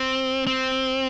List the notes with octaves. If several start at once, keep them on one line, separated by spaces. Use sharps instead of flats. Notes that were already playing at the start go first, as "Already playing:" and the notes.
Already playing: C4
C4